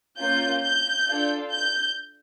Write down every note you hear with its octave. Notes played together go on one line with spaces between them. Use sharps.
A#3 C#4 F4 G6
G6
D4 F4 A4
G6